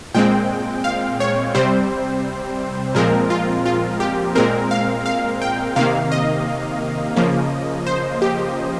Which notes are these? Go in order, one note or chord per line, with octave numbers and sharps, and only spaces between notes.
A#2 G#3 C4 G5
F5
C#5
C3 G3 C4 C5
A#2 F3 G#3 C4 A#4
F4
F4
G4
A#2 G#3 C4 A#4
F5
F5
G5
C3 D#3 A#3 F5
D#5
C#3 F3 A#3
C5
G4